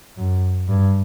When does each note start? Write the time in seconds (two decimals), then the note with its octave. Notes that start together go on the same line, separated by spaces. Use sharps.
0.18 F#2
0.68 G2